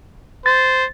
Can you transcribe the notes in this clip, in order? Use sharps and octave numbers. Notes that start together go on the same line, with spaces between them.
C5 A6